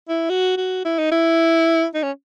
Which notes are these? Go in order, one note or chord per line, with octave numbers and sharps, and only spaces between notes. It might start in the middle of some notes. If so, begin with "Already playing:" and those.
E4
F#4
F#4
E4
D#4
E4
D#4
C#4